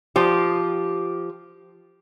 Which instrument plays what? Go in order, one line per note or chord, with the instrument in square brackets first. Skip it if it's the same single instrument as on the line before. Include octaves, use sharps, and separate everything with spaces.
[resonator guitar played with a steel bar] F3 G4